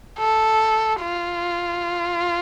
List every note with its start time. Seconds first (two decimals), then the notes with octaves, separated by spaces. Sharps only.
0.19 A4
1.01 F4